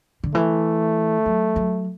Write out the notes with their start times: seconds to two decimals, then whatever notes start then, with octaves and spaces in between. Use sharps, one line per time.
0.24 D3
0.34 E3 A3
1.26 F#3
1.56 F#3